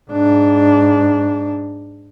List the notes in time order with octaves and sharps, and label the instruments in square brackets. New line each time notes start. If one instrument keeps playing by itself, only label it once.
[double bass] G#2 D4